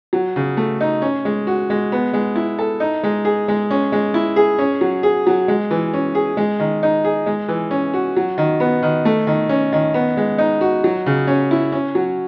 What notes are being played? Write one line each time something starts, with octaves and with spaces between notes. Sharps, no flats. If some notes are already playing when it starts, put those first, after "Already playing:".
F#3
C#3
A3
D#4
C#4
G#3
F#4
G#3
B3
G#3
E4
A4
D#4
G#3
G#4
G#3
C#4
G#3
E4
G#4
C#4
F#3
G#4
F#3
G#3
E3
C#4
G#4
G#3
D#3
D#4
G#4
G#3
E3
C#4
F#4
F#3
D#3
B3
D#3
A3
D#3
C#4
D#3
B3
G#3
D#4
F#4
F#3
C#3
C#4
E4
C#4
F#3